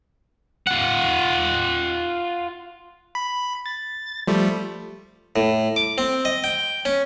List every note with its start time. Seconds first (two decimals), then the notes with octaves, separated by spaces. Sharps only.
0.67 F4 F#5
3.15 B5
3.66 A6
4.27 F3 G3 A3
5.36 A2
5.76 D6
5.98 C4
6.25 D#5
6.44 G5
6.85 C#4